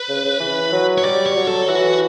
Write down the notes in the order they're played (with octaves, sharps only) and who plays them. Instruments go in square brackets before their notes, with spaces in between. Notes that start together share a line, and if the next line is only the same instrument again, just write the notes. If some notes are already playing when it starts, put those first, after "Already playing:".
Already playing: [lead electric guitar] B4
[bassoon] C#3
C#3
E3
F#3
[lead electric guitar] C#5
[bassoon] G3 [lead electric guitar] D5
[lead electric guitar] C#5
[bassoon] F#3
[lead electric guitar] A4
[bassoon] E3 [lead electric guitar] F#4